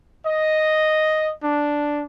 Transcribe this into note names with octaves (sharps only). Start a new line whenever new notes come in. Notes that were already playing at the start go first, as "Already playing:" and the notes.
D#5
D4